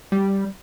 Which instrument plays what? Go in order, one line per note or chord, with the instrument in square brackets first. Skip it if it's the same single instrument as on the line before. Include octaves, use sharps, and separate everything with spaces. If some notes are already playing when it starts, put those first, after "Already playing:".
[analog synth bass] G3